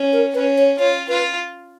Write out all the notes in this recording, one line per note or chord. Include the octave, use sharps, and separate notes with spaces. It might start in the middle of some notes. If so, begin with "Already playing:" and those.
Already playing: C#4
A#4
C#4 B4
C#5
F4 C#5
F4 B4